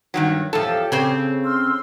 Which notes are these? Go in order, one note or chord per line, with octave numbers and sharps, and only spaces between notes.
G2 D#3 F#3
E2 F3 G4 A4 C#5
C#3 C4 C5
C6 E6 F6